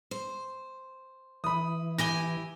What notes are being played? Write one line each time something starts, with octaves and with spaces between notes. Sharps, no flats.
C5
E3 B5 D#6
E4 G4 G#5 A#6 G7